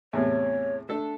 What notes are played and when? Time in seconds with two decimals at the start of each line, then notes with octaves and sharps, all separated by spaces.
0.13 E2 A2 C3 C#5
0.89 A3 D4 A4